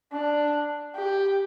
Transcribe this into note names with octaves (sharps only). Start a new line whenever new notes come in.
D4
G4